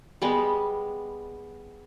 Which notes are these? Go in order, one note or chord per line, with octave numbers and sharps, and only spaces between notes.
G3 G#3 B3